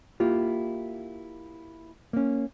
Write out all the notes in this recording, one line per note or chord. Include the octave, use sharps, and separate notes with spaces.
A#3 E4 F4 G4
A#3 C#4